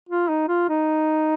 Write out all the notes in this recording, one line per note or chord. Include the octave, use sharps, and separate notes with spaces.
F4
D#4
F4
D#4